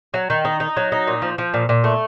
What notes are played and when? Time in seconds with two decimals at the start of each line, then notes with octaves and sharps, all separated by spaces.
0.14 F#3
0.30 D#3
0.45 D#4
0.60 D#4
0.77 F#3
0.92 D#4
1.07 A#2
1.22 F3
1.38 F3
1.54 A#2
1.69 A#2
1.84 A3